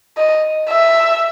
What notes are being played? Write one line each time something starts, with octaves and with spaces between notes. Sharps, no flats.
D#5
E5